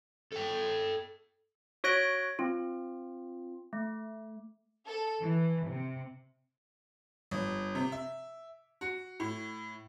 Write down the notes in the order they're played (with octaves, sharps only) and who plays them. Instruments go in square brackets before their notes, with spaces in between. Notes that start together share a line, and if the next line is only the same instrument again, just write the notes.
[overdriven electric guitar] A4 G5
[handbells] F#4 C#5 F#6 A#6 D7
C4 F4
A3
[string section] A4
E3
C3
[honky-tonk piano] G1
C3
E5
F#4
A2